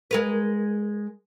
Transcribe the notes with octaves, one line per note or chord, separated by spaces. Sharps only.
G#3 A#4 B4